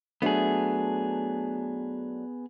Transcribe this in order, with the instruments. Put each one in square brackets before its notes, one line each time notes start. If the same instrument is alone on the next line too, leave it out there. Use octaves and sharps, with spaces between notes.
[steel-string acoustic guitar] F#3 A3 D4 [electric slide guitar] B3 G#4